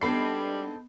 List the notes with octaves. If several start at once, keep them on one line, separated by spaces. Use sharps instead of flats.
G#2 G3 B3 C4 D4 A4 B5 C7